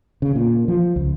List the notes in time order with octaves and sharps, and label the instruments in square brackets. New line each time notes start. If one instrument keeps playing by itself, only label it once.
[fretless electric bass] C#3
A#2
F3
C#2